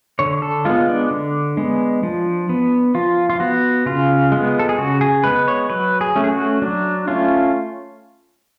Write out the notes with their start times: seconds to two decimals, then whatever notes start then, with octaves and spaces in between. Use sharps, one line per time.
0.19 D3 C#5
0.42 A4
0.65 G#3 B3 F4
0.89 D4
1.11 D3
1.57 G#3 B3
2.03 F3
2.49 B3
2.95 F3 F4
3.30 F4
3.40 B3 F#4
3.86 C#3 F4
4.32 G#3 B3
4.59 A4
4.69 G#4
4.78 C#3 F#4
5.01 G#4
5.24 G#3 B3 B4
5.48 C#5
5.70 F#3 B4
6.01 G#4
6.16 A3 C#4
6.24 G#4
6.32 F#4
6.62 F#3 D4
7.08 A3 C#4 F4